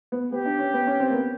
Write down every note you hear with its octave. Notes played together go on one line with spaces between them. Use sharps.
B3
B3 G4
D4
C#4
B3
C#4
C4
A#3
B3